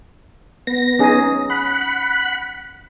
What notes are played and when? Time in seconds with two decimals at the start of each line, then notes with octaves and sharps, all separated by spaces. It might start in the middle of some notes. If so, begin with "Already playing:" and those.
0.67 B3 A#6
0.99 C#4 D#4 G#4
1.50 F#5 B5